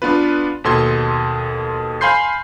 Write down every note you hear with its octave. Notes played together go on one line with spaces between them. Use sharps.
B3 D4 F4 B4
D#2 B2 A4 C6 G#6
F5 G#5 B5 C6 G6 C7